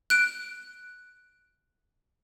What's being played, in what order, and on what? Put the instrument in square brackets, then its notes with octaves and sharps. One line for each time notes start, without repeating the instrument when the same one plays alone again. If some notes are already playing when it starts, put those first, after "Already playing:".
[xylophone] F#6 D7